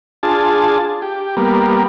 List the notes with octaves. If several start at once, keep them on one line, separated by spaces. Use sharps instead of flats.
D4 F4 G#4 A5
G4
G3 A#3 B3